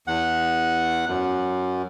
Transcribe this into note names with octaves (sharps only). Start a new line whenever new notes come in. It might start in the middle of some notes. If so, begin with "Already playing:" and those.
E2 F#5
F#2